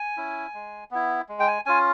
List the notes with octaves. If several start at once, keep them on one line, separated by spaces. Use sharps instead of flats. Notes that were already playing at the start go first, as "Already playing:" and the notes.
Already playing: G#5
C#4 E4
G#3
B3 E4
G#3
G5
G#5
C#4 F4 G#5